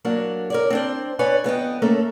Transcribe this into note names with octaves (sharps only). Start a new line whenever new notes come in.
F#3 A#3 D4 F#4
A#4 C#5 D5
C4 D4 C5
B3 B4 C#5 D5 G#5
F2 B3 D#5 G5
A3 A#3 C#4 A4 E5